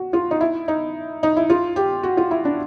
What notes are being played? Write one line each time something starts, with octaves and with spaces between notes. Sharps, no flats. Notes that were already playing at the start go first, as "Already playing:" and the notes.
Already playing: F#4
F4
D#4
E4
D#4
D#4
E4
F4
G4
F#4
F4
E4
D4